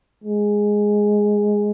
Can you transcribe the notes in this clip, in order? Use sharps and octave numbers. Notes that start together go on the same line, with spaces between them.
G#3